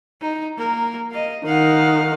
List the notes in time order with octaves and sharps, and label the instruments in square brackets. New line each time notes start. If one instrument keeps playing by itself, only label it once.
[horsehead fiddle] D#4
A#3 A#4
D#5 F5
[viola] D#3 [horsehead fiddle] F5 F#5